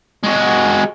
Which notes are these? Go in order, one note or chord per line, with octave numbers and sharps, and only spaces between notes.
G#3 F#4